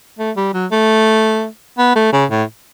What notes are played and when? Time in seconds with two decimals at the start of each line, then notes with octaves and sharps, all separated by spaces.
0.19 A3
0.36 G3
0.54 F#3
0.71 A3
1.78 B3
1.95 A3
2.13 C#3
2.30 A2